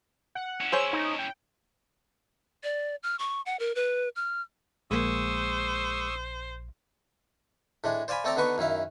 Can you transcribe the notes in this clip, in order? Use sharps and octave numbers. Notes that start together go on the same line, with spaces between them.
F#5
C#4 E4
G#4 C5 C#5 E6
D#4
G5
D5
F6
C#6
F#5
A#4
B4
F6
A#1 G#3 A#3 C5 C#6 D#6 E6
A2 G#3 D4
C5 D5 F5 G#5 B5
A3 C4 A4 D5 A#5
D3 B3 D#4 B4 C#6
F#2 D#3 E4 F5